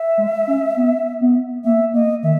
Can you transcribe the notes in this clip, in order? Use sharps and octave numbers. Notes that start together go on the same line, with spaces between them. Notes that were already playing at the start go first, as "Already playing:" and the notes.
Already playing: E5
G#3
C#4
B3
B3
A#3 E5
A#3 D#5
D#3 E5